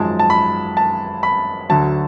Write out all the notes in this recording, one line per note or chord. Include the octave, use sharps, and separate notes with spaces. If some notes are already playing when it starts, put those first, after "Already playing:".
Already playing: G#1 F#2 F3 G#3 A5
A5
B5
A5
B5
D2 D3 F#3 A5